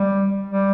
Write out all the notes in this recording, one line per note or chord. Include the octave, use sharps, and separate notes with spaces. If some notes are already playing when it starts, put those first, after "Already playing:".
Already playing: G3
G3